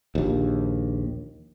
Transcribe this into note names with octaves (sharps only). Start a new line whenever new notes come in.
A#1 D#2